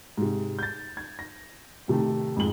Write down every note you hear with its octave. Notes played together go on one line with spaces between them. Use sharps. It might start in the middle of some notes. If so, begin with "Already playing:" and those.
G#2 C3
G6 A6
G#6
A#6
A2 C3 D#3 A3
F2 G#2 G#3 F#7 G7